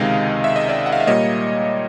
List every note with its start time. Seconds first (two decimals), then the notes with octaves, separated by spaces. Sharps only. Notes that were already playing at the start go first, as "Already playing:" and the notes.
Already playing: C#2 C3 D#3 G#3 D#5 F5
0.44 E5
0.56 D#5
0.69 D5 E5
0.86 F#5
0.92 F5
1.00 E5
1.07 A#2 G3 A#3 C#5 D#5